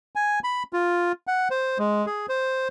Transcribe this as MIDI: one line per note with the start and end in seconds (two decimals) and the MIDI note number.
0.16 0.39 80
0.44 0.63 83
0.73 1.12 65
1.27 1.48 78
1.50 1.78 72
1.79 2.06 56
2.06 2.26 68
2.29 2.68 72